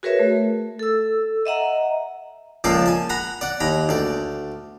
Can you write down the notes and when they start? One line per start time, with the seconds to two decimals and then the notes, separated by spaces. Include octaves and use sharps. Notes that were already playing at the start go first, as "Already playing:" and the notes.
0.03 F#4 G#4 A#4 B4 C#5 E5
0.19 A3
0.79 A4 E6
1.46 D#5 E5 F#5 A#5
2.64 C#2 F3 A#3 A4 D5 A5
2.86 G#5 A5
3.10 F#5 A#5 B5
3.41 D5 F#5
3.60 D#2 A#5 B5
3.89 D2 D5